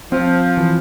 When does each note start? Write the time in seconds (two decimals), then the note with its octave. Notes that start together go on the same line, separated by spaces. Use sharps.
0.12 F3 C4
0.57 E3